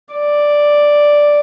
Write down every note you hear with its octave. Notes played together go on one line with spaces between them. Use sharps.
D5